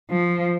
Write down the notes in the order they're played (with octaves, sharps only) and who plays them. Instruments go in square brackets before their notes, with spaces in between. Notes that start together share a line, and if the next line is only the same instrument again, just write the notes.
[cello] F3